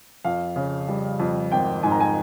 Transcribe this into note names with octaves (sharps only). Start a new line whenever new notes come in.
F2 F5
C#3
G3
F2
G#1 G5
G#2 G#5
A#5
G#5